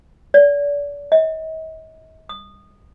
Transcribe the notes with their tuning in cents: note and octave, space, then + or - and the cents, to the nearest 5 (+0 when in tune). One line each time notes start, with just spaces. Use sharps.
D5 -35
D#5 +45
D#6 -15